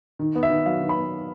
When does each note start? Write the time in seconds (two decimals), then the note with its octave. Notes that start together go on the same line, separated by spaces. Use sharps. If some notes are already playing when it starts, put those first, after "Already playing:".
0.19 D#3
0.35 B3
0.43 E5
0.50 D#3
0.66 F#3 F5
0.81 D#3
0.89 B5
0.96 B3